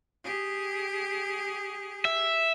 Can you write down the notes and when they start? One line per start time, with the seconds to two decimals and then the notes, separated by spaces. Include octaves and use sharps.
0.24 G4 G#4
2.05 E5